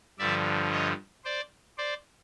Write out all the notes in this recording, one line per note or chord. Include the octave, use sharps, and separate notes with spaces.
G2 D3 F3 D5 E5
C#5 D#5
C5 D5
C5 D5